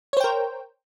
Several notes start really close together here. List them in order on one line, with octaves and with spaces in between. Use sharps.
C#5 C5 G5 A#4